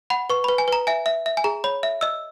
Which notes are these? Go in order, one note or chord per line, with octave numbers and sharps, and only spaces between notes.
F#5 B5
B4 C#6
B4 B5
G#5
B4 A#5
E5 G#5
E5
E5
G#5
G#4 A#5
C#5 B5
E5
D#5 E6